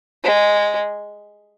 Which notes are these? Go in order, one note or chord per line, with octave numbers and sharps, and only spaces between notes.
G#3